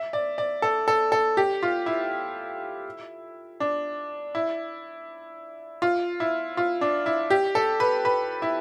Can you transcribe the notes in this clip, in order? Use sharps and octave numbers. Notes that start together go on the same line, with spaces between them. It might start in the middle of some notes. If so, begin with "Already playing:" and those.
Already playing: E5
D5
D5
A4
A4
A4
G4
F4
E4
D4
E4
F4
E4
F4
D4
E4
G4
A4
B4
B4
E4